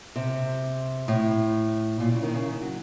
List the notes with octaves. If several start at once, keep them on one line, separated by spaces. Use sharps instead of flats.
C3
A2
A#2
C#3
D#3
C#3
F#3